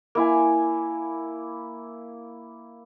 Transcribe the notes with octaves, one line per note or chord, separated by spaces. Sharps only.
A#3 E4 G#5